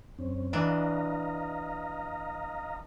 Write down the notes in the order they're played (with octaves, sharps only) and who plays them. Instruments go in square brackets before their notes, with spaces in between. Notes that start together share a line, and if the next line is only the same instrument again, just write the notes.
[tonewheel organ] F#2 C4 C#4
[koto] E3 D4 [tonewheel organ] D#5 F5 A#5